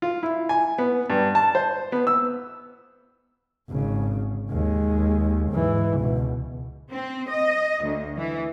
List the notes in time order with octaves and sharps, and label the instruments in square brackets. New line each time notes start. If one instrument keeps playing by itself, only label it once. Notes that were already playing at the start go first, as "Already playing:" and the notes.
[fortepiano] F4
E4
G#5
B3
G2
A5
C5
B3
E6
[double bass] G#1 C#3
D#2 G#3
G#2 E3
C#2 B2
[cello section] C4
D#5
D2
E3